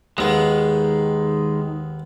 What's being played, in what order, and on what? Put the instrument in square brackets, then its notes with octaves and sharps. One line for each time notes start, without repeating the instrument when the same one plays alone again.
[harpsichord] D#2 B3 [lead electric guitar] D#3 G#3